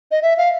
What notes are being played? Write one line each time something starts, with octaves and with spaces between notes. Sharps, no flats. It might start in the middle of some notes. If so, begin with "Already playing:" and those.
D#5
E5
F5